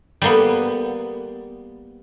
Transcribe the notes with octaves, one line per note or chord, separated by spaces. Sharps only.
G3 A#3 B3